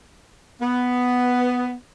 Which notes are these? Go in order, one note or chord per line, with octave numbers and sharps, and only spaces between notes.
B3